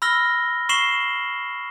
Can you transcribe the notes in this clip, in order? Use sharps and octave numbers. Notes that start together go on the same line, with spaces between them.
B5 E6 F6 A#6 G7
C#6 C7 E7 F#7 G7